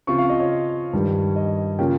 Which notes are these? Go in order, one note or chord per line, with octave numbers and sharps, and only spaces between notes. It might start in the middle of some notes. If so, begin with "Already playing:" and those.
C#3 F3 C4 F4 C#6
F5
D#5
C#5
G2 D#3 G3
D#5
C#3 F3 A#3 C#4 F4 G5